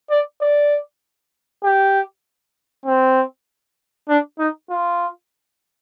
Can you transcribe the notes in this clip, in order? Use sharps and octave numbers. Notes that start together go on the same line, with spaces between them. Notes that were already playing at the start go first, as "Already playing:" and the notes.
D5
D5
G4
C4
D4
D#4
F4